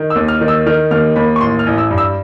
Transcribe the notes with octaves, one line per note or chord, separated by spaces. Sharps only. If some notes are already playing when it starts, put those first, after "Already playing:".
Already playing: D#3
E6
D#2
F6
D#3
E6
D#3 F6
D#2 F6
D#2 B5
C#6
A1 C6
F6
A1
E6
G2
E6